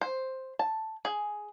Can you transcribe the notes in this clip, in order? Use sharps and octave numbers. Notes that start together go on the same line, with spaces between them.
C5
A5
G#4